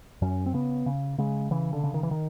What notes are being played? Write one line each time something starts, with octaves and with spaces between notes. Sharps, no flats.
F#2 C#4
C4
C#3 B3
C#3
C#3 G#3
C#3 E3
D3
C#3
D#3
E3
D#3